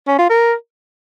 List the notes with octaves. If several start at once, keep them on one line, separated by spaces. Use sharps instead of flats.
C#4
F4
A#4